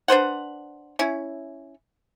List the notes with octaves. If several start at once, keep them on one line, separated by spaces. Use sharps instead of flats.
D4 B4 C5 F#5
C#4 E4